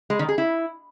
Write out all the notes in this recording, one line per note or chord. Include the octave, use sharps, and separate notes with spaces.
G#3
D#3
G#4
E4